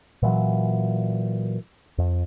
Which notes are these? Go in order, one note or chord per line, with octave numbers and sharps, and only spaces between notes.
A#2 E3 F#3
F2